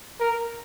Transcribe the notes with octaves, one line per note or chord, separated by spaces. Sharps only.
A#4